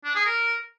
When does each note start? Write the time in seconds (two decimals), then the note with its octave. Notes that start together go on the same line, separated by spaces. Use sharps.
0.05 D4
0.15 G#4
0.26 A#4